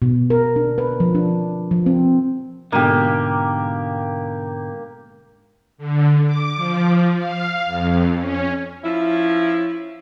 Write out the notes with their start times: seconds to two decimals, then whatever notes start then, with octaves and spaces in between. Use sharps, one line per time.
0.02 B2
0.30 A#4
0.56 D4
0.78 B4
1.00 F3
1.15 D4
1.71 F3
1.86 C4
2.72 G#2 B2 D3 A#3 G4
5.78 D3
6.25 D6
6.56 F3
7.17 F5
7.66 F2
8.18 C#4
8.83 F3 C#4 E4